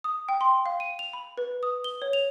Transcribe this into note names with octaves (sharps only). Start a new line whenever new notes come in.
D#6
G5
C6
F5
D#7
F7
B5
B4
D#6
G7
C#5
F7